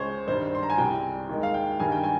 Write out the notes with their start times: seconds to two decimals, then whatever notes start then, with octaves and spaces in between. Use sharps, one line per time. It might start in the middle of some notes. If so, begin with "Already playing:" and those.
Already playing: C#2 C#3 G#3 C5 C#5
0.27 G2 D#3 G3 C5
0.55 C6
0.63 A#5
0.70 G#5
0.78 C2 C3 G3 G5
1.29 D#2 D#3 G#3
1.43 F5
1.54 G5
1.80 G2 D#3 G3 G#5
1.92 G5
2.04 G#5